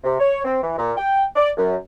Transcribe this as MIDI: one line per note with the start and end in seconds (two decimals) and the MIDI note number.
0.04 0.19 48
0.20 0.41 73
0.45 0.61 60
0.62 0.75 52
0.78 0.93 46
0.97 1.24 79
1.36 1.51 74
1.57 1.76 42